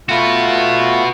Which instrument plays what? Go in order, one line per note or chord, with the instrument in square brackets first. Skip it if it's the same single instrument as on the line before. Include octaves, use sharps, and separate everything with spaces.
[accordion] A3 F4 [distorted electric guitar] F#4 B4